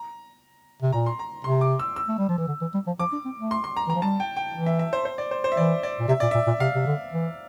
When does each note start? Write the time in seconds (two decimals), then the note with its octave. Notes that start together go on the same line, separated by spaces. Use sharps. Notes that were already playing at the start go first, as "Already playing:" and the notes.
Already playing: A#5
0.82 C3
0.92 A#2 A#5
1.06 C6
1.19 A#5
1.44 C3 C6
1.61 D6
1.79 E6
1.96 E6
2.08 A3
2.18 G3
2.28 F3
2.38 E3
2.47 D3
2.61 E3
2.74 G3
2.87 F3
2.99 F3 D6
3.12 D4
3.25 C4
3.38 A3
3.51 C6
3.64 C6
3.76 A#5
3.87 E3 A#5
3.95 F3
4.02 G3 A5
4.20 G5
4.36 G5
4.54 E3
4.66 E5
4.79 E5
4.93 C5
5.05 C5
5.18 D5
5.31 C5
5.44 C5
5.52 E5
5.57 E3 D5
5.83 D5
5.99 A#2
6.08 C3 E5
6.20 A#2 D5
6.31 A#2 E5
6.47 A#2
6.60 C3 F5
6.74 C3
6.86 D3
7.12 E3